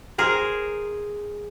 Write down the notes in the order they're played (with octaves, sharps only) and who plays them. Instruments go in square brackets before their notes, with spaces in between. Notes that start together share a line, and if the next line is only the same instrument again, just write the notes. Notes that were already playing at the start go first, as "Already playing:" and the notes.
[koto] G#4 A#4 C5